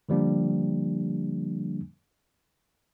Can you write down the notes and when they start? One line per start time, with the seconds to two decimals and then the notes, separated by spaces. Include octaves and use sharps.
0.09 D3 F3 G3 A#3 D4